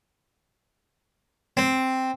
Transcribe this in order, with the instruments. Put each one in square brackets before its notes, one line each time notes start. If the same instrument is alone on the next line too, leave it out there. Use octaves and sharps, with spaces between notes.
[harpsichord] C4